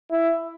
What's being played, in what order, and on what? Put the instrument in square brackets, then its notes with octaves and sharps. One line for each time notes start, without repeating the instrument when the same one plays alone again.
[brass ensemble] E4